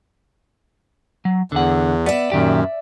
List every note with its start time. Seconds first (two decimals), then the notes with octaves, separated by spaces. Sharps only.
1.25 F#3
1.52 E2 D3 F#5
2.06 B3 D5 E5
2.32 F#2 A#2 D#3 G4